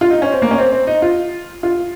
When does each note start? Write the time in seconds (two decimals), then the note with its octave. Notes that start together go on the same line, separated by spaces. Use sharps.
0.01 F4
0.10 D#4
0.22 C#4
0.32 C4
0.42 A#3
0.51 C#4
0.58 C4
0.72 C4
0.87 D#4
1.02 F4
1.63 F4